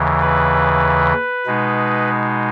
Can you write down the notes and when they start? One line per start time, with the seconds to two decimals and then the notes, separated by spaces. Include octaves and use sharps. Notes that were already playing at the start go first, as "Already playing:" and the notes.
Already playing: D#2 C#3 E3
0.21 B4
1.47 B2 G#3 D#4